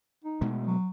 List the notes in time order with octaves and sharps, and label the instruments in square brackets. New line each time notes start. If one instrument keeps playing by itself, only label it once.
[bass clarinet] D#4
[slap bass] B2 G#3 A3
[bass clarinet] F#3